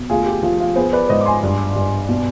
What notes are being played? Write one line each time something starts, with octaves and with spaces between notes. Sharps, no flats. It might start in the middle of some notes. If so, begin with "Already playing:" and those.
Already playing: B2
D2 F4 G#4
G4
F3 F4
F4
B3 G#4 C5
B4 D5
G#2 C5 D#5
D6
G#5 C6
G2
G2
B2